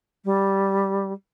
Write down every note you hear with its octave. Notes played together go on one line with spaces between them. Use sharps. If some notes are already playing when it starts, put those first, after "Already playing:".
G3